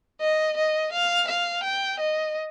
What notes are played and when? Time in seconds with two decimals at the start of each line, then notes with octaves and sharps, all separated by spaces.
0.21 D#5
0.57 D#5
0.92 F5
1.28 F5
1.64 G5
2.00 D#5